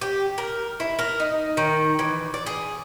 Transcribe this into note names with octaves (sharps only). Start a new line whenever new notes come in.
G4
A#4
E4
A#4
D#4
D#3
E3
D5
G#4